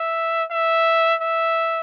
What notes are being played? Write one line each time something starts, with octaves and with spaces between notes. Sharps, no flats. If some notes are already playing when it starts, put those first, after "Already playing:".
Already playing: E5
E5
E5